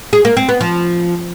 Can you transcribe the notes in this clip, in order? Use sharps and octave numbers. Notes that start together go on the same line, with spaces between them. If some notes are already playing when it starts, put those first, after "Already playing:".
G#4
A#3
C4
B3
F3